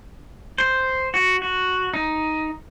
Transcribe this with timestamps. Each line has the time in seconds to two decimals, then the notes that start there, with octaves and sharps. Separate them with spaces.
0.58 C5
1.14 F#4
1.42 F#4
1.94 D#4